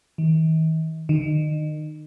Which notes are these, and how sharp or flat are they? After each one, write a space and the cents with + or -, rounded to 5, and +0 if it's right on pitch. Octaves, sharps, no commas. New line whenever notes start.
D#3 +45
D#3 -30